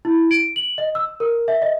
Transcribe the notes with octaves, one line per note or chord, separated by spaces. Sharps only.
E4
D7
F#7
D#5
E6
A#4
E5
D#5